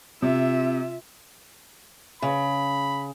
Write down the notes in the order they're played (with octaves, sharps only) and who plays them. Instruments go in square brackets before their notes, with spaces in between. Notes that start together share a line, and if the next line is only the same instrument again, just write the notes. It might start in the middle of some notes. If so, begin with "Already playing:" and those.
[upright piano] C3 [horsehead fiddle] F4 E5
[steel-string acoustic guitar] C#3 [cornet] B5